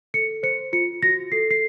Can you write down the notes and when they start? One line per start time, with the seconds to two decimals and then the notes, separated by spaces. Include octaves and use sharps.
0.14 A4 C#7
0.43 C5 C#7
0.73 F4 C#7
1.02 F#4 A#6
1.32 A4 C7
1.51 C7